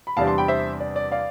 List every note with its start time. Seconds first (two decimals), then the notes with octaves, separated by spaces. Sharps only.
0.07 B5
0.17 E2 C3 G3 D4 F5 A5
0.27 A5 C6
0.38 G5 B5
0.48 C5 E5
0.80 D5
0.96 D5
1.12 D5 F5